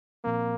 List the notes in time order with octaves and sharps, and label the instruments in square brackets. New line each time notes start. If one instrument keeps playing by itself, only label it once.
[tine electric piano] A#2 F3 C4 [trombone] A#3